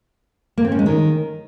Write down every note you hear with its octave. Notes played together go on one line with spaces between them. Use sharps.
A#3
C4
C#4
G#3
D#3